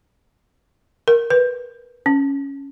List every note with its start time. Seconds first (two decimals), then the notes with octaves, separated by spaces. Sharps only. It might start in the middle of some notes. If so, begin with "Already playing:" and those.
1.08 A#4
1.30 B4
2.06 C#4